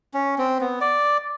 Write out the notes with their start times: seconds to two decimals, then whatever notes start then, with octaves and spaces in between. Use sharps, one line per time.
0.14 C#4
0.38 C4
0.61 B3
0.81 D5